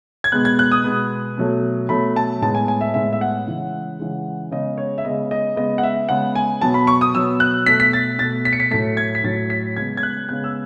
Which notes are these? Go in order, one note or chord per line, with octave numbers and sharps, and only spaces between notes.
G#6
B2 G#3 B3 F#6
G#6
F#6
D#6
B2 G#3 B3
B2 F#3 A3
B2 F#3 A3 B5
A5
A2 G#3 B3 A5
G#5
G#5
E5
A2 G#3 B3 E5
E5
F#5
C#3 E3 G#3
C#3 E3 G#3
C#3 G#3 B3 D#5
C#5
E5
C#3 G#3 B3 D#5
D#5
C#3 G#3 B3 D#5
F#5
E5
C#3 G#3 B3 F#5
G#5
B2 F#3 B3 A5
B5
C#6
D#6
B2 F#3 B3 E6
F#6
B2 A3 B6
B6
A6
B2 A3 A6
B6
C#7
B6
A2 F#3 A3 B6
G#6
B6
A2 F#3 A3 A6
B6
C#3 G#3 B3 G#6
G#6
F#6
C#3 G#3 B3 F#6
E6